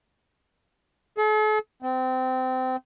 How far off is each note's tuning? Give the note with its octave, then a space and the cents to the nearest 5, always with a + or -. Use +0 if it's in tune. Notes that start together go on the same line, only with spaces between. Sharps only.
A4 -45
C4 -25